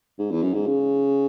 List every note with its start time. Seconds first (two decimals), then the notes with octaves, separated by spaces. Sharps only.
0.19 G#2
0.31 E2
0.42 F#2
0.54 G#2
0.66 C#3